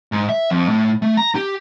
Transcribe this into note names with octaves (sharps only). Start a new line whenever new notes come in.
G#2
E5
F2
A2
A3
A#5
G4